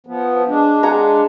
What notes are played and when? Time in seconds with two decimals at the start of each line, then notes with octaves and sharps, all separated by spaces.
0.07 F3 B3
0.48 G#3 D4
0.83 G#4 F#5 A#5